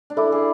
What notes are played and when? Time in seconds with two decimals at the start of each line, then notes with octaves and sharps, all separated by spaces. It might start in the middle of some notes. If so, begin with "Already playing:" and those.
0.10 D4
0.17 E4 A4 E5 B5 D6
0.32 G#4